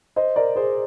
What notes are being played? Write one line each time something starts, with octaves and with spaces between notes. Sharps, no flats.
C5 D#5
A#4 D5
G#4 C5